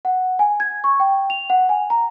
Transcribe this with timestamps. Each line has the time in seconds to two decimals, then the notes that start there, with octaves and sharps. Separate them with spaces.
0.05 F#5
0.39 G#5
0.60 G#6
0.84 C#6
1.00 G5
1.30 F7
1.50 F#5
1.69 G#5
1.90 A#5